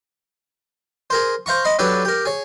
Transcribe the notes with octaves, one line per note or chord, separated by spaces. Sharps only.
G#4 A#4 C5
C5 F5 A#5 C#6
D#5 B5 C6
F#3 D4 G4 A4 B4
G4 A#4
G#4 C#5